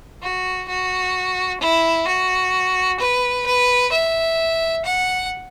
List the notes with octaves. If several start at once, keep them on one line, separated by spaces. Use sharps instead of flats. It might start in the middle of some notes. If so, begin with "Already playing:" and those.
F#4
F#4
E4
F#4
B4
B4
E5
F#5